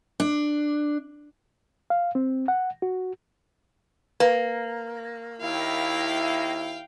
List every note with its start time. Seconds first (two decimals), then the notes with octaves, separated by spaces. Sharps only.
0.20 D4
1.90 F5
2.15 C4
2.48 F#5
2.82 F#4
4.20 A#3 B4
5.41 D#2 E4 F5 G5